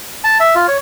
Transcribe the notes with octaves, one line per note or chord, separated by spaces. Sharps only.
A5
E5
F4
C#5